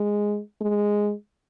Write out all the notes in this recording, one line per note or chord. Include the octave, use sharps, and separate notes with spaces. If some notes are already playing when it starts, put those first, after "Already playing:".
Already playing: G#3
G#3